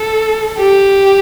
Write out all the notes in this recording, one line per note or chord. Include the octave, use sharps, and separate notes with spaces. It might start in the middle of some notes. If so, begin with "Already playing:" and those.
Already playing: A4
G4